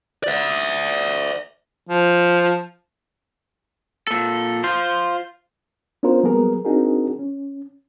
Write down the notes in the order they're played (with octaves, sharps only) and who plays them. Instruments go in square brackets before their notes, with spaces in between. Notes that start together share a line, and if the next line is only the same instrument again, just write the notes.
[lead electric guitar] D5 E5
[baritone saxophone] F3
[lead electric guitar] A#2 A4
F4 C5
[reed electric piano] B3 C#4 D4 F4 A#4 C5
F#3 G3 A#3 B3 G#4 A#4
C4 D4 D#4 F#4 G#4 A#4
C#4